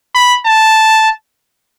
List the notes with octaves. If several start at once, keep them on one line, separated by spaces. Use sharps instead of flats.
B5
A5